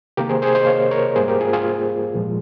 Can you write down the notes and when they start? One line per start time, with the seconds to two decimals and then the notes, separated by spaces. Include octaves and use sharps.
0.17 C3 D#3 A#3 G4 A#4
0.29 G#4 C5
0.42 G#4 C5
0.55 C5 D#5
0.66 C#5 F5
0.91 A#4 C#5
1.16 G#2 G3 A#3 G#4 C5
1.28 G4 A#4
1.41 F4 G#4
1.53 F4 G#4
2.14 A#2 F3 G#3